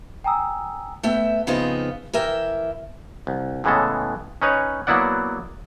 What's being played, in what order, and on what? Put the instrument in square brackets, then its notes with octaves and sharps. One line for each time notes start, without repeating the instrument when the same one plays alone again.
[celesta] G5 G#5 A#5 D#6 E6
[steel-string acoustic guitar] A3 B3 E5 G5
C#3 F3 B3 C4 D#4 F4
E3 A#4 E5 G5
[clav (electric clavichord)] C2
A2 C#3 E3 G#3 B3 A4
C#4 D#4 B4 C#5
F#3 A#3 B3 E4 D5 F#5